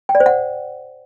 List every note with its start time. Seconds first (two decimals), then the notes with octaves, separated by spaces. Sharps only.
0.09 G5
0.15 D5
0.20 C5
0.26 F#5